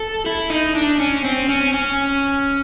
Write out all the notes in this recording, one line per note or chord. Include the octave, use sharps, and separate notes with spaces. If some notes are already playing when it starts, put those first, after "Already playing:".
Already playing: A4
E4
D#4
D4
C#4
C4
C#4
C#4